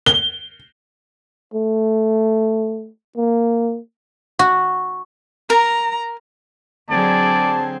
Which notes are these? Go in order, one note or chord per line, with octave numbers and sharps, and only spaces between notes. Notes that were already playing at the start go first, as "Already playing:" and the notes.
G7
A3
A#3
F#4
A#4 A#5
D3 F#3 C4 G#4 D5 A5